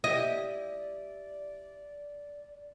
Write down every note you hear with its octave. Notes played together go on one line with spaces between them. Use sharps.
E4 G4 D5 D#5